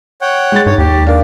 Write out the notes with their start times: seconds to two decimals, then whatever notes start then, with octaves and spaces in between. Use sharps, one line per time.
0.21 C#5 F#5 G5
0.52 G#3 A6
0.66 G2 D#4 C#5
0.78 D#2 G4
1.07 D4 A#4 F5